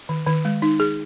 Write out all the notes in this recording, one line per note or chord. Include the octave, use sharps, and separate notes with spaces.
D#3
D#3
G#3
D#4
G#4